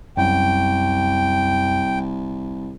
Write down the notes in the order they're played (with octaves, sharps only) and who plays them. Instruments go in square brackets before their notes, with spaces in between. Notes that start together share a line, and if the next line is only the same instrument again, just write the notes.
[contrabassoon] C2 [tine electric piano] F#2 [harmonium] G5